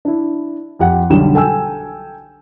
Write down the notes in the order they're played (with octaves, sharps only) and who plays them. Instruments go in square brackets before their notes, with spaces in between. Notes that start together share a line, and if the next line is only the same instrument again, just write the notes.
[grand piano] D4 E4
F2 G4 F#5
B1 D3 G3 E7
A4 G5 G#5 E6